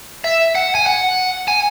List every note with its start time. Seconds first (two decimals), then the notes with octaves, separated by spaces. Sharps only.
0.24 E5
0.55 F#5
0.75 G#5
0.86 F#5
1.48 G#5